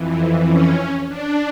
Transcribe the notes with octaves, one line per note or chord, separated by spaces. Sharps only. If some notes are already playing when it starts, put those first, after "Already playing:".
Already playing: F2 E3
C#4
D4